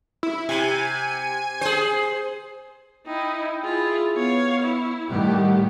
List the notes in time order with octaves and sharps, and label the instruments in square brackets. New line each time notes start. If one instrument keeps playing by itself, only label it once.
[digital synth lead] E4
[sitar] C3 [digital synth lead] G#5
[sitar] G#4 C5
[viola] D#4 E4 [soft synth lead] G5
[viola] E4 F4 [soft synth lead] G#4
[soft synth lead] B3 [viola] C#5 F5
[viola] E4
[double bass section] A2 D#3 G3 [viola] G4 [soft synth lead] F#5